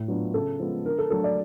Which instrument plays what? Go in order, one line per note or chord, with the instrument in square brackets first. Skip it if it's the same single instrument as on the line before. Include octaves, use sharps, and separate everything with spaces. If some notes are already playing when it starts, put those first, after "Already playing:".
Already playing: [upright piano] A2
F#3 B3 D4 F4
C#3 A4
F3 G#3 B3
D3 A#4
A4
F#3 A3 D4 A4
D5